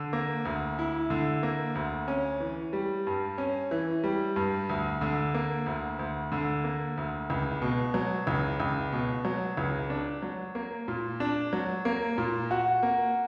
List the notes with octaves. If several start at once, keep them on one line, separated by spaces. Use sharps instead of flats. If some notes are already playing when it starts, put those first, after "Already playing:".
Already playing: D3
A#3
D2
E4
D3
A#3
D2
C#4
E3
G3
G2
C#4
E3
G3
G2
D2
D3
A#3
D2
D2
D3
A#3
D2
C#2
B2
F#3
C#2
C#2
B2
F#3
C#2
D4
F#3
A#3
A#2
D4
F#3
A#3
A#2
F#4
A#3